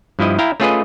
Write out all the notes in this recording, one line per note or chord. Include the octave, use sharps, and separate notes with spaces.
G2 F3 E4 D#5
E4 F5 G5 A#5
A3 C#4 F4 G#4 B4 D#5